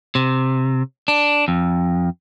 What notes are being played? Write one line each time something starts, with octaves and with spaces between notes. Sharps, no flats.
C3
D4
F2